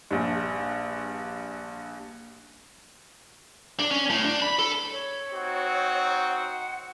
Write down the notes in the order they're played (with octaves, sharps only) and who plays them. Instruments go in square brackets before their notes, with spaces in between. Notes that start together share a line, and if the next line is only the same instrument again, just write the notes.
[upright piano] A#1 G2
[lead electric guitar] D4
C#4
A2
D4
B5
A4
[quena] C#5
[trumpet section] C4 D#4 F#4
[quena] F#5